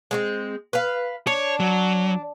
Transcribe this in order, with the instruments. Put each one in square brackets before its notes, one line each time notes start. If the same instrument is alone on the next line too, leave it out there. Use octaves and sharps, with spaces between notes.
[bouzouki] G#3 B3 C4
B4 F5
[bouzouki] D4 [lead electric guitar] C#5
[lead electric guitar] F#3